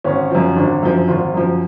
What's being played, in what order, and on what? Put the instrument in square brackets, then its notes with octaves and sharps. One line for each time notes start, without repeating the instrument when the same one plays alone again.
[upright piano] G#1 C#4
F#2 F3
G#1 D4
F#2 F3
G#1 F4
F#2 F3